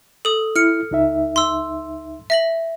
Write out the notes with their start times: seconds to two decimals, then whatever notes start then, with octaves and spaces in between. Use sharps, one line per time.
0.25 A4 D#6
0.56 E4 F6 C#7
0.91 C#2 D#4 E5
1.36 C6 E6
2.30 E5 A#6 F#7